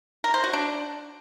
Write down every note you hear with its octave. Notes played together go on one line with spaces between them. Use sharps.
A#4
C5
F#4
D4